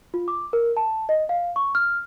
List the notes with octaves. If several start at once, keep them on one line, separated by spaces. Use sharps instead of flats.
F4
D6
A#4
A5
D#5
F5
C#6
F6